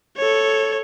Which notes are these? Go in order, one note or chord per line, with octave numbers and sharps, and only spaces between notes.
A4 C#5